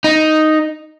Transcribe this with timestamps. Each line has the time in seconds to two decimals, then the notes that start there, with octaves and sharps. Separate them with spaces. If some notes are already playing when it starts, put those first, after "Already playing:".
0.04 D#4